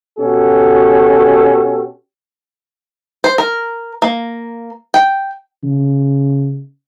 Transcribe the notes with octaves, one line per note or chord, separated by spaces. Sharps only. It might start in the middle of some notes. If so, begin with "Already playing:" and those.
B2 C#4 F#4 G4 A4
C5
A#4
A#3
G5
C#3